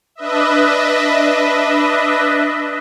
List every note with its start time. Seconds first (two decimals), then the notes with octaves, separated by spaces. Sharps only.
0.15 D4 B4 D#5 E5